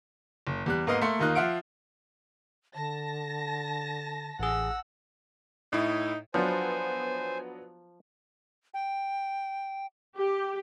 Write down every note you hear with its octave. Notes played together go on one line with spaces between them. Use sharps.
F#1
E2 G3 F#6
G#2 A#3 B3 D#5 F6 C7
A3 A#3 C6 C#7
D#2 D#3 D#4 F4 F#6
F3 F4 E5 F#5 F6 D7
D3 A5 A#6
A1 G#4 F#5 E6
A2 D#4 E4
F3 F#3 B3 D4 C5 G#5
G5
G4